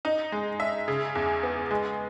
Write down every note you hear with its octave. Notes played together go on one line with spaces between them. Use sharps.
D#4
G#3
E5
C#3
E2
B3
G#3